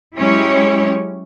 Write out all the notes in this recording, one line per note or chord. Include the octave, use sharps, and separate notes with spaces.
F#3 G#3 C#4 E4 G4 C#5